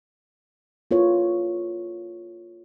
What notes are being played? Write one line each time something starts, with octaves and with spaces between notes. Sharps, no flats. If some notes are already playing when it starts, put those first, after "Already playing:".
A#3 E4 F4 A4 B4 C#5